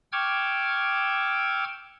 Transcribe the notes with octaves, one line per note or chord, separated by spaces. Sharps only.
G5 C#6 D6 E6 F6 G#6